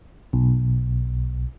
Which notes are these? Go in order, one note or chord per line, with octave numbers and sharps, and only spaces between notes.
B1